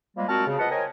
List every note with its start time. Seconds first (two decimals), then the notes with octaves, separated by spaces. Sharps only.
0.16 F3 G3 G#3 A#3
0.28 A#2 G#3 C4 F#4 A5 F6
0.47 C#3
0.59 F3 B4 D#5 F#5 A5
0.71 A#4 C5 C#5 D#5 G5 G#5